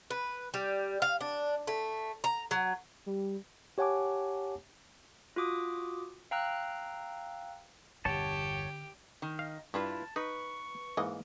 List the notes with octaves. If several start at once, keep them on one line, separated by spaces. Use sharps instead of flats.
B4
G3
F5
D4
A3
A#5
F#3
G3
G4 C#5 F#5 G#5 A5 D6
F4 F#4 D6 D#6
F5 G5 A#5 E6 F#6
G1 E2 B2 D3 G4 C#5 A5
D#3
D#5 F5
G2 E4 F4 B4 A5
D#4 B4 C#6
G#2 E3 A#3 D#5